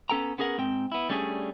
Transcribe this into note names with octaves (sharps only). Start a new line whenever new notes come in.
B3 C#4 A4 G5 A#5
B3 C#4 G#4 A#4 F#5
G#2 C4 G5
B3 E4
G3 A3 C#4 D4 G4 G#4